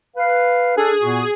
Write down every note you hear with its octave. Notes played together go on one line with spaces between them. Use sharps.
B4 F5
D4 G#4 A4
A#2 B3 F#4